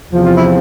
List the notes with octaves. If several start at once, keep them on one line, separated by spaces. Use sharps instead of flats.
E2 C3 F3
F4
E4